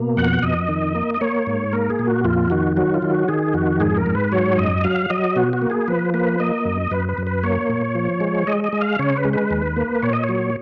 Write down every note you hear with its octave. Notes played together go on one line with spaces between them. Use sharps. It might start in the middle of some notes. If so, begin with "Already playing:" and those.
Already playing: B2 A#3
F2 F#5
F2 D#5
D#3
A#3
D#5
A#3 C#5
G#2
A#3 A#4
G#4
A#2
F#4
F2 F4
D#3 F#4
F#3 F#4
F4
D#3
F#4
D#3 G#4
F2 F#4
G#2 G#4
A#4
G#2
B4
F#3 C#5
F#2 D#5
F#3 F5
F#3 D#5
B2 F#4
F#4
A#3
G#4
F3 B4
A#3 B4
A#3 D#5
F#2
F#2 B4
B4
F#2
B4
A#3 C#5
A#2
F3
G#3
G#3 D#5
D#5
G#3
F5
C#3 C#5
B4
G#3
B4
D#2
A#3
A#2 C#5
D#5
C#5
F#3